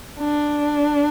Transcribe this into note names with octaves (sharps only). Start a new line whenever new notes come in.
D4